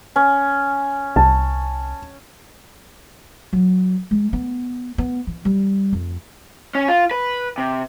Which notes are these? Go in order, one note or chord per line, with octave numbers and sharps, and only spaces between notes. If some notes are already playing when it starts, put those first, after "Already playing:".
C#4
C2 A5
F#3
G#3
B3
B3
E3
G3
F2
C#4
F4
B4
C3